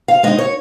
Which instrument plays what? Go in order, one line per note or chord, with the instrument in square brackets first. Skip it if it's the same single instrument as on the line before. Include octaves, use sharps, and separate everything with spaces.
[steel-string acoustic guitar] F5
G#3 D#4 D#5
C#5